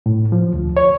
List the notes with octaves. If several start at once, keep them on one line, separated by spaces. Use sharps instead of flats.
A2
F3
D2
C#5